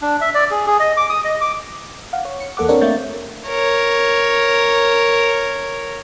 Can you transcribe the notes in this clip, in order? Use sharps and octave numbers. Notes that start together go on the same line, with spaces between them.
D4
E5
D5
G#4
G#4
D#5
D6
D#6
D#5
D6
F5 F#5
C#5
C#7
E2 A#3 A4 F#5 D6
C4 D4 G4 A#4 C#5
A3 A#3 E5 C#6 G6 A6
A#4 C#5